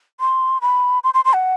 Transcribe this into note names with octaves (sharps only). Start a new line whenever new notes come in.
C6
B5
C6
C6
C6
F#5